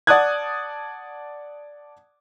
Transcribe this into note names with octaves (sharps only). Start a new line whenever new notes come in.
D5 F#5 A5 D#6 F#6 G#6